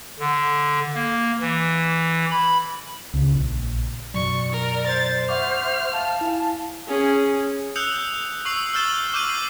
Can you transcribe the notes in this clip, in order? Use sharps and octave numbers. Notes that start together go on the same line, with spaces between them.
D3
A#3
E3
B5
C#2 C#3
A#1
F#2 B2 F#3 D5 C#6
A#4
C5 A6
E5 F#5 C#6 D6 F6
F5 A5
E4 F5 G#5
C#4 G#4
D#6 E6 F#6 G6 C#7 F7
C#6 E6 C7 F#7
E6 F6 G6 A6 E7 G7
D6 E6 G6 D#7 F#7 G7
C7